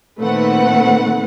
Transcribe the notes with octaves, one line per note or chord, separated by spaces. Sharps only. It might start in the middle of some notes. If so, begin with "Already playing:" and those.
A#2 D#3 A3 C4 B4 F#5